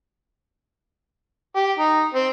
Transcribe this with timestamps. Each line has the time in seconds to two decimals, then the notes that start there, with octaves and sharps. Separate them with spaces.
1.56 G4
1.79 D#4
2.14 C4